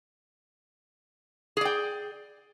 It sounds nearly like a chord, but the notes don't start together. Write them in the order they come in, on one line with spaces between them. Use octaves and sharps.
G#4 D5 G5